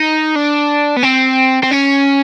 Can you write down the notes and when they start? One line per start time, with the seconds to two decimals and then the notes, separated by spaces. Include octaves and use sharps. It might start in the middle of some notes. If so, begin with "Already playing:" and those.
Already playing: D#4
0.36 D4
0.97 B3
1.03 C4
1.63 C4
1.71 C#4